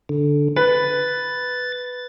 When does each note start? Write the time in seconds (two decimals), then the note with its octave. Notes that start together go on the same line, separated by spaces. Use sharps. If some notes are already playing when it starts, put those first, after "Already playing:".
0.09 D3
0.56 B4 A6